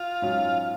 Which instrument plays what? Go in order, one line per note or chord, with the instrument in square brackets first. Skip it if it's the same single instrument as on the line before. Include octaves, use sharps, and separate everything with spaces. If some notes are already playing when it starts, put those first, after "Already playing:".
Already playing: [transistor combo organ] F4
[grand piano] G#2 F#3 C#4